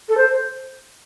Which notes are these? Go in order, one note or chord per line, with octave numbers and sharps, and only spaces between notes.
A4
C5